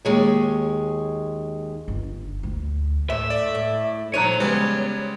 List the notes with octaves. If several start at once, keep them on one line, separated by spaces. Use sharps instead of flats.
D#2 G#3 C#5
G1
D2
A2 E5
D5
A2
A#2 F3 D#4 C#5 A#5 F#6 D#7
C#3 G3 G#3 B3 B4